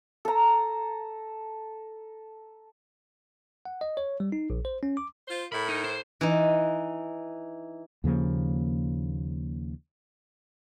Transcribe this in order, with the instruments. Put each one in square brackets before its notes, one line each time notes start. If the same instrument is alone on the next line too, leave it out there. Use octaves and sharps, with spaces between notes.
[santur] A4 A#5
[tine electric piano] F#5
D#5
C#5
G3
D#4
A#1
C5
C#4
D6
[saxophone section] F4 C5
[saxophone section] A2 A#4 [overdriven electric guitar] B5
[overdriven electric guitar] D#4
C5
[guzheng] E3 D#4
[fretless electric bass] D#2 C#3 F3 A#3